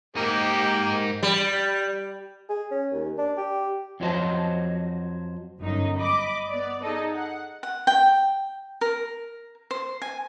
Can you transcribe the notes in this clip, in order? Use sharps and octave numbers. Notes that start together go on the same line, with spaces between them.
G#2 A#3 D#4 G4
G3
G#4
C#4
D#2
D4
G4
F2 F#3 F#4 C5 D#5 A5
G1 F#2 D#4
D#5 B5 D6
B3 D5
D#4 G#4 A4 D#5
F#5
F#5
G5
A#4
C5
G#5